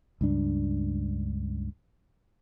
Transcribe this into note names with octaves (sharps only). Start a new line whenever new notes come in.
C#2 G2 D4